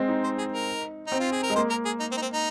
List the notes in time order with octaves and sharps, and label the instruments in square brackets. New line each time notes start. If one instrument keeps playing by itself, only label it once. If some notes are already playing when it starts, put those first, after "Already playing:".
Already playing: [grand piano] G#3 C4
D#4
[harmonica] C5
G#4
A#4
D#4
[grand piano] C4
[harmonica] F4
G#4
A#4
[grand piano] G#3
[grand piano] A#3 [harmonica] C5
[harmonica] A#4
G#4
D#4
C4
D#4
C4
D#4